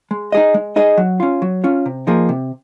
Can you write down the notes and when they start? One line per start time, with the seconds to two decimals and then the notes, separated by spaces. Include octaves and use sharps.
0.11 G#3
0.32 D#4 G#4 D#5
0.54 G#3
0.76 D#4 G#4 D#5
0.98 F#3
1.20 C#4 F4
1.42 F#3
1.64 C#4 F4
1.86 C3
2.07 F3 A#3 D#4 G#4
2.29 C3